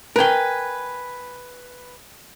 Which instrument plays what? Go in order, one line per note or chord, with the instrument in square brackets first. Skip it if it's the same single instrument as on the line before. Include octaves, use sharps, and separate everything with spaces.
[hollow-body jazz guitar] A#4 G5 [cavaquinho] B4 G#5